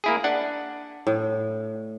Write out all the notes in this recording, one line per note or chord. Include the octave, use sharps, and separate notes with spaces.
A#3 E4 G#4
D4 F#5
A2